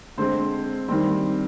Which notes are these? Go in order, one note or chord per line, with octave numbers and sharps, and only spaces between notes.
D3 G#3 C4 C5
D#3 G3 C4